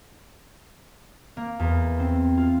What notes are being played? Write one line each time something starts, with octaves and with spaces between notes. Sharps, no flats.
A#3
E2
C4
F4